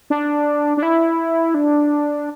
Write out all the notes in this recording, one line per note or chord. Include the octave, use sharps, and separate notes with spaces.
D4
D4
E4
D4